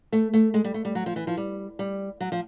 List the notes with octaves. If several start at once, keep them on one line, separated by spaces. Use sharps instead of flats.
A3
A3
G#3
G3
A3
G3
F#3
F3
E3
F3
G3
G3
F#3
F3